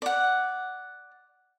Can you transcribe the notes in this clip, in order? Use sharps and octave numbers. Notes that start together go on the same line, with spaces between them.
D5 F#5